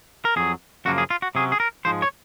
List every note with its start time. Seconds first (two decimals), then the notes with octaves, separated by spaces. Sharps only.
0.25 A#4
0.36 F2 D#3 F#3 G#4
0.85 F#2 C#3 F3 A#3 F#4
0.98 G#4
1.10 F4
1.22 F#4
1.35 C3 F#3 C#4 G#4
1.52 G#4
1.60 A#4
1.85 G#2 F3 G#3 C5
2.02 C#5